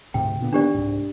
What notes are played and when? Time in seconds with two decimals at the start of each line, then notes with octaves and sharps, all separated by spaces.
0.14 D2 G#2 C3 G5
0.40 A#2 D3 B3
0.52 D#3 B3 D4 G4 D5
0.74 C2 G#2